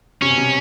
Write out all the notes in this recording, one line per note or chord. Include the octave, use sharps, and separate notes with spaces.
C3 C#4
B2
C3